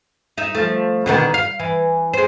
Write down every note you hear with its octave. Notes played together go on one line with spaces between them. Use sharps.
D#4 E5
F3 A3
B2 D3 D#3
F5
E3
G#3 C5